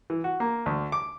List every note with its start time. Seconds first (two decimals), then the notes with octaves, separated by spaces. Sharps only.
0.10 E3
0.24 F#4
0.40 A#3
0.66 D2
0.92 D6